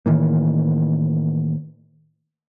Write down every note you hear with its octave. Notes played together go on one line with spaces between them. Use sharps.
A2 D#3 E3 A#3